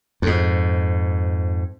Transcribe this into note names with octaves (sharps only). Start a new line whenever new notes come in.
F2 G#2